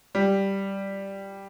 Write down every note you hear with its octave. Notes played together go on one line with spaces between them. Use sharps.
G3